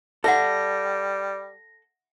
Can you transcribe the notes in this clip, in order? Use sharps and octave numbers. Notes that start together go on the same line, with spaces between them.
G3 A4 E5 F#5 A#6